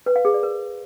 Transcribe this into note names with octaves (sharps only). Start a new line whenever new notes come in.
B4
F5
G#4
D5
A#4